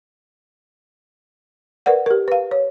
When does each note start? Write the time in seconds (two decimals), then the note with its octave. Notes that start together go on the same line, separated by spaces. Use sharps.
1.86 A#4 B4 D5 F#5
2.06 G4 A#4
2.28 B4 F5
2.51 C#5